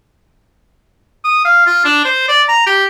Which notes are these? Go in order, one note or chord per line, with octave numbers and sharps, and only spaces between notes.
D#6
F5
F4
D4
C5
D5
A#5
G4